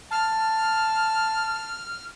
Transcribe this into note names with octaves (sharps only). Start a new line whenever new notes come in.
A5 F6